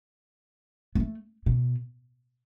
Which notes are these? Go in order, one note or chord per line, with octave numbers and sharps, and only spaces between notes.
B3
A3
B2